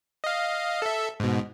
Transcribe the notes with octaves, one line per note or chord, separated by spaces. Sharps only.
D#5 F5
A4 E5
G#2 B2